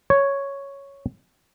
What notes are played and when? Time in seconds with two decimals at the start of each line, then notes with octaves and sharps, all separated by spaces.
0.10 C#5